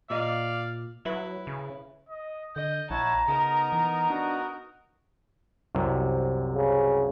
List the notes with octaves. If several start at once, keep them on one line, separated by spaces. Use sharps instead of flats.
A#2 D5 D#5 F5
F#3 E4 B4
C#3
D#5
D3 D#5 G6
A#1 E4 C#5 F#5 A5 A#5
C#3 B3 D#4 A#4 D#6
E3 A#5
D4 F#4
C2 F#2 C3
C#3